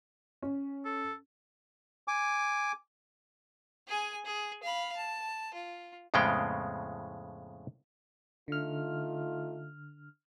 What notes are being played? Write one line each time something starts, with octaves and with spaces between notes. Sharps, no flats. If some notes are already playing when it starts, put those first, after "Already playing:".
C#4
A4
G#5 D6
G#4 G#5
G#4
F5 B5
A5
F4
F2 A2 C#3 G#3 B3 G5
D3 A3 D#4 F4 F6